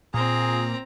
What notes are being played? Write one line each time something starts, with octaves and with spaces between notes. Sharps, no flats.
A#2 C4 G#4 A#5